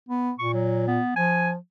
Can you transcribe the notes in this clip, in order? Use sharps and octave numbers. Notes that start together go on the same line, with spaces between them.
B3
A#2 C#6
F#3
B3
F3 G#5